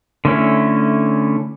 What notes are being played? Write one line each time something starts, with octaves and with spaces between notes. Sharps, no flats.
D3 A3 C#4 E4